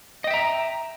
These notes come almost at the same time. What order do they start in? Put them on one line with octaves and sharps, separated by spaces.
D#5 G5 E5 A#5